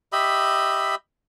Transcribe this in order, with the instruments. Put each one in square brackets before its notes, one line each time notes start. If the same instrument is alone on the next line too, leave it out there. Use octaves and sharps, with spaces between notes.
[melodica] G4 D#5 E5 B5